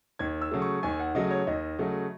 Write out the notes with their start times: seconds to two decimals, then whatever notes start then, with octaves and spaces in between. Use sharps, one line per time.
0.19 D#2 G#6
0.41 E6
0.52 C#3 F#3 A3
0.62 C#6
0.83 D#2 G#5
1.00 F#5
1.15 C#3 F#3 A3 D#5
1.31 C#5
1.47 D#2 D#5
1.79 C#3 F#3 A3